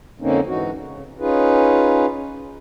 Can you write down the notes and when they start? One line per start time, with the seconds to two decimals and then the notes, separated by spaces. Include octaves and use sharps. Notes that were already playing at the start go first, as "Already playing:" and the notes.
0.21 F2 D3 A#3 C4 C#4 D#4
0.47 G#2 E3 D#4 F#4
0.76 C#3
1.19 C#4 D#4 F4 G#4 B4